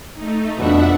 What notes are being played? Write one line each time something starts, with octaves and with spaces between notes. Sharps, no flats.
A3 D#4
F2 B2 D4 E5 F#5